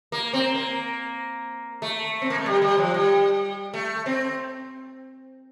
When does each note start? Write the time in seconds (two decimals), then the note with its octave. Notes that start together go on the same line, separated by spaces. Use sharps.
0.12 A#3
0.33 C4
0.54 A#3
1.82 A3
2.22 C4
2.30 A#3
2.38 A3
2.46 G3
2.62 G3
2.78 F3
2.94 G3
3.74 A3
4.06 C4